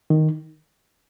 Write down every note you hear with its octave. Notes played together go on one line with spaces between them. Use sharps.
D#3